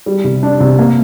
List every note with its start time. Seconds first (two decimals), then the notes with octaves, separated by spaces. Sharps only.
0.06 G3
0.24 C3
0.43 D4
0.60 C3
0.79 A#3